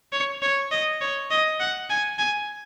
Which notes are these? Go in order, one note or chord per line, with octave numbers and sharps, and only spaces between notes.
C#5
C#5
D#5
C#5
D#5
F#5
G#5
G#5